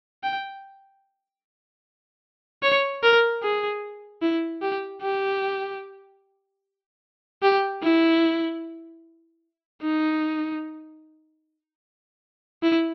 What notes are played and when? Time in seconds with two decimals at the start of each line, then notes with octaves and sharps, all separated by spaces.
0.24 G5
2.63 C#5
3.03 A#4
3.43 G#4
4.22 E4
4.62 G4
5.02 G4
7.43 G4
7.83 E4
9.82 D#4
12.63 E4